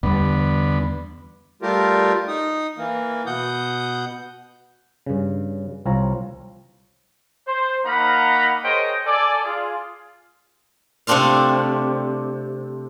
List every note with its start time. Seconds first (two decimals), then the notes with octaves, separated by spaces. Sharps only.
0.03 E2 D3 G3 B3
1.62 G3 A3 F4 G4 A#4
2.28 D#4 D#6
2.78 E3 A#3
3.26 B2 F#5 D#6 G6
5.06 G2 C#3
5.86 C2 C4 F4 C#5 A#5
7.47 C5
7.85 A#3 D#4 F5 F#5 A#5 B5
8.64 G#4 A#4 C5 C#5 D#5 G5
9.05 A4 D5 G#5
9.44 F4 G#4
11.07 C3 A3 C4 D4 F4 F5